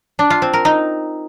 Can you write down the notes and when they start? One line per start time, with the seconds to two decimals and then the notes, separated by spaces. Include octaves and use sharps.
0.19 D4
0.30 F4
0.42 C4
0.53 A#4
0.65 D#4